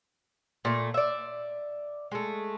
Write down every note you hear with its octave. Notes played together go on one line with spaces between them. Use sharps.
A#2 A3
D5 E5
G#3 A3